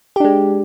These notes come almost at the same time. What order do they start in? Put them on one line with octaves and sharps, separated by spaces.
G4 D4 G#3